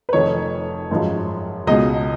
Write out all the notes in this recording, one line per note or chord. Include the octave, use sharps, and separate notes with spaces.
B4
F1 F2 D#3 C#5
G#1 F#2 F3 G#3
C#2 B2 G#3 D#5